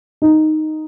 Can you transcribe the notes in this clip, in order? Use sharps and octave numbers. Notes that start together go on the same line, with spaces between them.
D#4